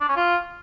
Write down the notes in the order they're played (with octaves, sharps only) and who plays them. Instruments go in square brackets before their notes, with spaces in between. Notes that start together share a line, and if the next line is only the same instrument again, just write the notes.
[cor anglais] D4
C#4
F4